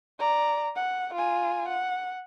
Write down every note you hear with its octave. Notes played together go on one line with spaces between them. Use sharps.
D5 A#5
F#5
F4 G#5
F#5